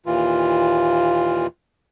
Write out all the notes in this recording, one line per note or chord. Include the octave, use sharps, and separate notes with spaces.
D#2 A#2 E3 F4